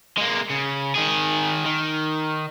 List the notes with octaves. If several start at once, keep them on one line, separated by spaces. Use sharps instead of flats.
G#3 A#3
C#3
D#3 G#4
D#3